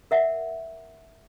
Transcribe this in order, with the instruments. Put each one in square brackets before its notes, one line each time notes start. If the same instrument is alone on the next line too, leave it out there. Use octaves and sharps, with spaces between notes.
[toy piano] A#4 E5 F#5